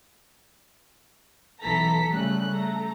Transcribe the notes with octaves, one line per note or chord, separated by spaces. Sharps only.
B1 E3 A4 A#5 B6
C#3 G3 A3 F#6
A3 A4 A#5